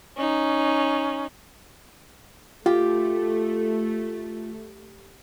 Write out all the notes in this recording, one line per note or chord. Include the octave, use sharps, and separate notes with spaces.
C#4 D#4
A3 F4 G4